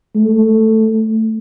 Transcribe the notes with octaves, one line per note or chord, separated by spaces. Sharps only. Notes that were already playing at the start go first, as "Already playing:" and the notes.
A3